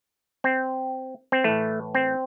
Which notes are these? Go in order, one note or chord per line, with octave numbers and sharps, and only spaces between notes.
C4
C4
A2 E3 A3
C4